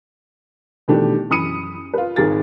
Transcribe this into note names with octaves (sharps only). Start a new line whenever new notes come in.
B2 D#3 E3 A3 D4 G4
F#2 E3 B5 D#6 C#7 D#7
F4 B4
G#1 D#3 G#4 A#4 A6